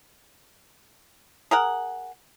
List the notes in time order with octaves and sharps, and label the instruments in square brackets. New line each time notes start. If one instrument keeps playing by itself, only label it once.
[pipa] G#4 A#4 F#5